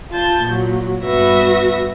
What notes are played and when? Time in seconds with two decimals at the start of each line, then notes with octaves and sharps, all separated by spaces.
0.11 F4 A5 G6
0.43 A#2 F#3
1.04 G2 B3 F#4 B4 E5 A#6